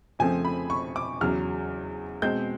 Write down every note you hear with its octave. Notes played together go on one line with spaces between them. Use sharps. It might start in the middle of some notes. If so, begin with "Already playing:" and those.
F2 C#3 F3 A3 C4 G#5
B5
C#6
D6
E2 C#3 F#3 F6
B2 G#3 C4 G6